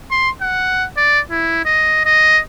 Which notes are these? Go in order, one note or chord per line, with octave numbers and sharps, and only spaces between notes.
C6
F#5
D5
E4
D#5
D#5